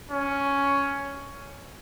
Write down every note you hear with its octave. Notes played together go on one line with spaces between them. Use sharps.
C#4